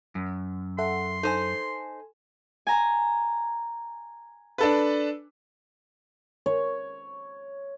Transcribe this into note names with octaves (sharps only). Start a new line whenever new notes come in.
F#2
A4 E5 F#5 C6
D#4 A4 C5 G#5
G#5 A#5
D4 A4 B4
C#5